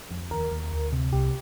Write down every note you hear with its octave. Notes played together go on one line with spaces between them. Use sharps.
F2
D#2 A#4
D#2
D2
C3
C2 G4